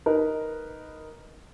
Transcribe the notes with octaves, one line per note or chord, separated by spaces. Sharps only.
D#4 A#4 B4